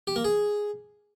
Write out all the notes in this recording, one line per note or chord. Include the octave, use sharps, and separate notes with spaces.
G4
A#3
G#4